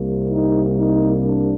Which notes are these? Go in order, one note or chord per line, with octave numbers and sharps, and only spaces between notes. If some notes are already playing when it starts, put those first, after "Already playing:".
Already playing: C2 C3 G3 A#3
D#4
D#4
D4